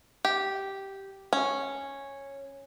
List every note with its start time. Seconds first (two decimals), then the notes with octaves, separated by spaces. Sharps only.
0.25 G4
1.33 C#4